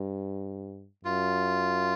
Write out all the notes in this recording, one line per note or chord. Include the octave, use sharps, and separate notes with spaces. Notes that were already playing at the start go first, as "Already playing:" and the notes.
Already playing: G2
F#2 F4